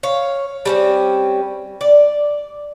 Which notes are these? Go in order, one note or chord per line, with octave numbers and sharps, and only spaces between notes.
C#5 F5
G3 C4 C#4
D5